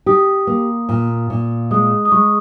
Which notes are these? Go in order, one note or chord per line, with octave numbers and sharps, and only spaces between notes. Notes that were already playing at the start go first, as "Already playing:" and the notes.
G4 D#6
A#3
A#2
A#2
G#3 D#6
D#6
G#3 C#6